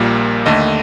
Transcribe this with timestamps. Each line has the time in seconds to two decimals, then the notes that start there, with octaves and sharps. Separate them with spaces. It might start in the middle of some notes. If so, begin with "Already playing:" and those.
Already playing: A#1 A#2 G3 A#3
0.46 D#2 D3 A3 D#5